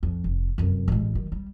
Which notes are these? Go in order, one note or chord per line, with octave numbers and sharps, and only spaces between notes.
F2
F1
F1 F#2
A1 G#3
D#3 F#3
G3